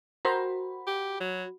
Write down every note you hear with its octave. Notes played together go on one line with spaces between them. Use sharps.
F#4 A#4 C5 A#5 B5
G4
F#3